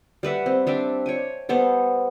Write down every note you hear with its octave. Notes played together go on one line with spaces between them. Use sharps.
G3 B4 E5 F#5
C4
G3 D4 E5 G5
C#5 G5 G#5
G3 B3 A4 C5